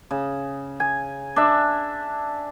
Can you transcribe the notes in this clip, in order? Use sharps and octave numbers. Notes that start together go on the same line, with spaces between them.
C#3
G#5
D4 E5